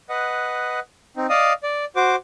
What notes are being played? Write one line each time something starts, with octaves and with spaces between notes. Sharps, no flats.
B4 D#5 F#5
C4 D#4
D5 D#5 F5 D#6
D5
F#4 C5 D6